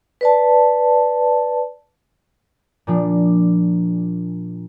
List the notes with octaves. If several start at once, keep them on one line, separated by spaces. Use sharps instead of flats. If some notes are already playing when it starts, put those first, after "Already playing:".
B4 D5 A5
A#2 F3 D4